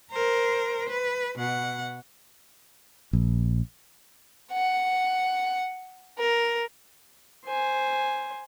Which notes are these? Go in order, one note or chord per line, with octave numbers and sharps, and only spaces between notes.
A#4 C5
B4
B2 F#5
A#1
F#5
A#4
C5 G#5